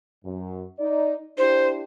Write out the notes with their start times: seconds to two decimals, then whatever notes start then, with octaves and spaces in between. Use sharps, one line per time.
0.24 F#2
0.79 D#4 D5
1.38 D4 E4 G4 C5